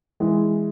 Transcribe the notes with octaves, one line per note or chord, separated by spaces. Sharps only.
E3 G#3